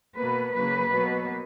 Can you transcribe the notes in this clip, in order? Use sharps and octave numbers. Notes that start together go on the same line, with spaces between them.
B2 A#3 B4
C#3 F#3 A#3 B4
B2 F#3 A#3